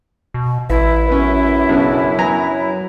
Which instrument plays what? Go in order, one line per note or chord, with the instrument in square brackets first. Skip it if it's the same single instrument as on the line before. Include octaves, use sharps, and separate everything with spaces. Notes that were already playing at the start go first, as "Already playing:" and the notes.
[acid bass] B2
[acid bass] A1 [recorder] E4 [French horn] B4 [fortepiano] E5
[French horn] F#2 [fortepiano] B3 C#4
[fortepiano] B1 C#3 B3 [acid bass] D4
[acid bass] F#3 [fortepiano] B3 G#5 A#5